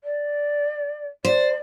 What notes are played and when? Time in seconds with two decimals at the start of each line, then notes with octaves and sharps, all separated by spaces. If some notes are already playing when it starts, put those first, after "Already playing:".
0.04 D5
1.25 C5 D5